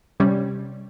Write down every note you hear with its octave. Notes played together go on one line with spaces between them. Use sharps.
C3 G3 C#4